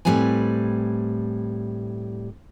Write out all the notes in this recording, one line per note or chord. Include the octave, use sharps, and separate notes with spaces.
A2 G3 C4 B4 G#5